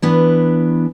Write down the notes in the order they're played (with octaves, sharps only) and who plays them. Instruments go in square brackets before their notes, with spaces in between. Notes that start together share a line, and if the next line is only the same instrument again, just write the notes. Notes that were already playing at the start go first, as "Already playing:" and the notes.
[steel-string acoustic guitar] E3 B3 D4